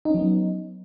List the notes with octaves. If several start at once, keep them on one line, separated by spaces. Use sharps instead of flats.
F#3 B3 C#4 D#4